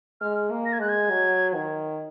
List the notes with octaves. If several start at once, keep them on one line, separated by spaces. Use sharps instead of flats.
G#3 F6
A#3
A#6
G#6
G#3 F#6
G#6
F#3
D#3